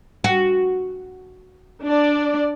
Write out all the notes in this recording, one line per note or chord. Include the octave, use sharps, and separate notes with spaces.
F#4
D4 D5